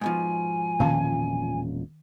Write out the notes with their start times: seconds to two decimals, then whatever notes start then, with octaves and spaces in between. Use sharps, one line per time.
0.01 G#2 B2 F3 G#5
0.79 E1 A#2 D#3 C#4 F5 A5